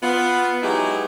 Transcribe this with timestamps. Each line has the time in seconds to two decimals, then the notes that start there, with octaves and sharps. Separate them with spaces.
0.03 B3 F4
0.63 F#3 G#3 B3 D#4 E4 G4